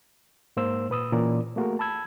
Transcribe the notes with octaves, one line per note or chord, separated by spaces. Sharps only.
G#2 A#3 C5 E6
A#2 B4 D#6 E6
A#2 E3 C#4 A#4 D5
A3 A#3 F#4 G#4 A#4
A5 B5 E6 G#6